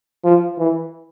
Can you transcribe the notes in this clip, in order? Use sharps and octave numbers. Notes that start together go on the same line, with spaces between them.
F3
E3